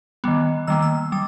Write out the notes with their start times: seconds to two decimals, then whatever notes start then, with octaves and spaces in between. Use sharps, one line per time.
0.24 D#3 G3 B3
0.67 D#3 G3 A#3 E6
0.82 E6
1.12 G3 D#6